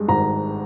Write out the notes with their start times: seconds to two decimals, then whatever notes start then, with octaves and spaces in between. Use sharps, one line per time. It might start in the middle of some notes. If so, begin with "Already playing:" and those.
Already playing: G2 G#3
0.08 G#1 A#5